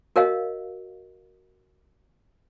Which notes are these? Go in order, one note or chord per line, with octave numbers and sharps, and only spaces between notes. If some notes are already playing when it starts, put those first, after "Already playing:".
F#4 A#4 C#5 D#5 F5